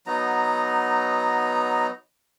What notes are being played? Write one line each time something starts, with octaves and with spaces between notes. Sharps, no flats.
F#3 B3 D#4 A#5